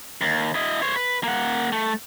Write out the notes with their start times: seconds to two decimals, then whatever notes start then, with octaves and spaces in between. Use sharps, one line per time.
0.21 D#2
0.55 E4 D#5
0.82 C5 C#5
0.96 B4
1.24 A#3 F#5
1.72 A3